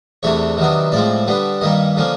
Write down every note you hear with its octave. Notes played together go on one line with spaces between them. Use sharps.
E2 C3 E3 A3 D4 C#5
C3 D#3 F#3 B3 D4
A2 F3 G#3 C4 D5
D3 G3 B3 D4
G2 D#3 G3 A#3 D#5
D3 F3 A#3 C#4